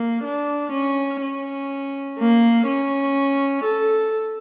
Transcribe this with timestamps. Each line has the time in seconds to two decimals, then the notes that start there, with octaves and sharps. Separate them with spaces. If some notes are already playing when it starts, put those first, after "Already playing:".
Already playing: A#3
0.24 D4
0.73 C#4
1.22 C#4
2.19 A#3
2.67 C#4
3.65 A4